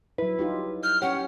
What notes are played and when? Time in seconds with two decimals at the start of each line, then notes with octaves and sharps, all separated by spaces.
0.18 F#3 E4 B4
0.39 D#4 F4 G4
0.83 F6 G6
1.02 C#4 G4 C#5 F#5